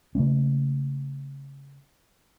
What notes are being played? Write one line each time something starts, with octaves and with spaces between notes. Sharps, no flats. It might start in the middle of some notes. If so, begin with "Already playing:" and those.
C#3 A3 A#3 C#4